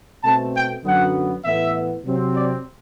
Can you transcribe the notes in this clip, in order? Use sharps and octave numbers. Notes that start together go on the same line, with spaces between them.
B2 A3 C4 A5
G5
F#2 D3 F#3 B3 F#5
A2 E3 B3 E5
C3 F#3 C4
D5